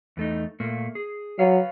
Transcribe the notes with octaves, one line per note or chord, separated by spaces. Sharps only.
E2 A3 D#4
A#2 A3 A#3
G#4
F#3 B4 C#5 F5